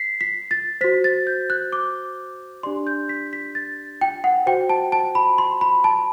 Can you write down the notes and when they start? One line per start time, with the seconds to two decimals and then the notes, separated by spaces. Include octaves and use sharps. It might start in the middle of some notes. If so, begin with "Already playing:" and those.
Already playing: B6 C7
0.21 B6
0.51 A6
0.81 F#4 C5 B6
1.04 A6
1.27 G6
1.50 F#6
1.72 D6
2.63 D4 G4 D5 C6
2.87 G6
3.09 B6
3.33 B6
3.55 A6
4.01 G5
4.24 F#5
4.46 F#4 C5 G5
4.69 A5
4.92 A5
5.15 B5
5.38 C6
5.61 B5
5.84 A5